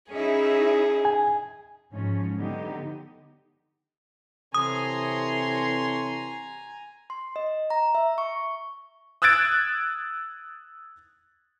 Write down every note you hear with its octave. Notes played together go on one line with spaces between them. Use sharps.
C#4 D#4 E4 G#4
G#5
G#2 F3 C#4
D3 F#3 B3 D#4 G4
C3 E3 A4 C#5 G#5 A#5 C6 D#6
C6
D#5
A#5
E5
C#6
D#6 E6 F#6 G#6 A6 D7